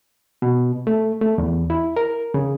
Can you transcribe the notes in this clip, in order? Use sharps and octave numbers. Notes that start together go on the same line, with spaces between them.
B2
A3
A3
E2
E4
A#4
C#3